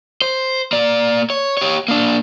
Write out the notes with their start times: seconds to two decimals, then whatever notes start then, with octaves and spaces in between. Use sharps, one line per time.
0.22 C5
0.73 A#3 D5
1.30 C#5
1.57 G4 C#5
1.88 A#3 D4